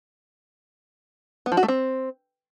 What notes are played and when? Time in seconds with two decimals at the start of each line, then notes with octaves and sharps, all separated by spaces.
1.46 B3
1.52 F3
1.57 F#4
1.63 A3
1.68 C4